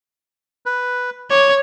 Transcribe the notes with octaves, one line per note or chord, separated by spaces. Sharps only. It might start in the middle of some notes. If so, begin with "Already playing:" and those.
B4
C#5 D6